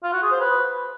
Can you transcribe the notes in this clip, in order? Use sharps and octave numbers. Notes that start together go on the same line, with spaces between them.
F4
F#4
G#4
C5
B4